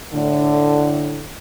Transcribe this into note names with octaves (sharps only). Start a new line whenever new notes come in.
A2 D3